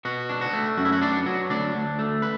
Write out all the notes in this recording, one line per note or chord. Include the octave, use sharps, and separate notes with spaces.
B2 F#4
D4
F#4
A3
F#2 F#4
E4
F#4
B3 D4 D5
F#3 F#4
D2 D4 D5
D2
A3
B4